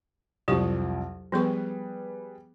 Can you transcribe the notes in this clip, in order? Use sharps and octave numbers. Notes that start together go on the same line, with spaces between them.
C2 F2 F#3 G4 C#6
F3 G3 B3 G#4 B4 C#6